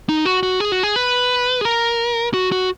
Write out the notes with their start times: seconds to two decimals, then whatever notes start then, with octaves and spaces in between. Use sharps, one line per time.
0.09 D#4
0.25 F#4
0.43 F#4
0.60 G#4
0.72 F#4
0.83 G#4
0.96 B4
1.61 G#4
1.65 A#4
2.34 F#4
2.52 F#4